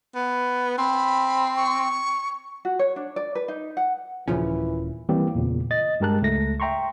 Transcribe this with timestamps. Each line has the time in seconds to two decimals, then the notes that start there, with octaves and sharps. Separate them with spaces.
0.15 B3
0.78 C4 B5
1.56 C#6
2.65 F#4
2.79 C#5
2.96 D4
3.16 D5
3.35 B4
3.48 D#4
3.77 F#5
4.28 D#1 A#2 C#3 E3 F3 C#4
5.09 E3 G3 A#3 C4 G4
5.35 E2 A#2 C#3
5.71 D#5 A6
6.00 G2 G#3 G4 A#4 A5 F#6
6.22 C#2 A3 A#6
6.60 E5 G5 A#5 C6 C#6